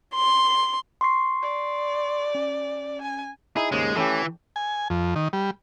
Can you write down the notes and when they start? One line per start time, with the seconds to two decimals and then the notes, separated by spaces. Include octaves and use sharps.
0.14 C6
1.01 C6 C#6 C7
1.42 D5
2.35 C#4
3.02 G#5
3.57 D#4 E4 G#4
3.72 D#2 G#2 C#3 G#3
3.96 E3 A3 C#4 G4
4.56 G#5
4.90 F2
5.16 D#3
5.33 G3